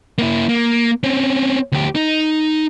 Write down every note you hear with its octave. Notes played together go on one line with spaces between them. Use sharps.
A#3 E4
A#3
C4 C#4
D2 G4
D#4